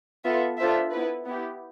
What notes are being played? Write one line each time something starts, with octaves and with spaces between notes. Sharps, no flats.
B3 F4 A4 E5
D4 F4 A4 C5 E5
B3 E4 B4
B3 E4 G4